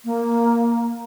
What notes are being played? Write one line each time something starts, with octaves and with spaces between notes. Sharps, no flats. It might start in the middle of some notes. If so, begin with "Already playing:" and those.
A#3